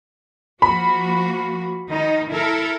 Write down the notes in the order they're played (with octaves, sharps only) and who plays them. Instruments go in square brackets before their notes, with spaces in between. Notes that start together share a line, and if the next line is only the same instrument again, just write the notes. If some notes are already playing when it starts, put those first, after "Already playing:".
[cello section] F3 A#3 F#4 [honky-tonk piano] B5
[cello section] D#3 D#4
E4 A4 A#4